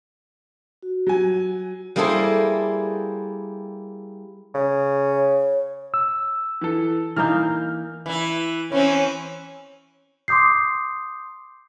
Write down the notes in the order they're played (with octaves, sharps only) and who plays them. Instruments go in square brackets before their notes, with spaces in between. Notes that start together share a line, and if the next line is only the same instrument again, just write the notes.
[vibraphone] F#4
[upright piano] F#3 G#5
[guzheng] G3 A#3 E4 G#4 A4 C5
[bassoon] C#3
[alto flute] C#5
[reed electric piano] E6
[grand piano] E3 A4
[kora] E3 A#3 D#4 [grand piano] F6 G6
[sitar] E3 E4
[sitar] E3 C4 [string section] C#4
[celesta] C6 D6 D#6 G6 C7